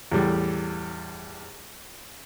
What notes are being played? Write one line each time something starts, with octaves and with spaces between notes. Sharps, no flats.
E2 A2 G3 A3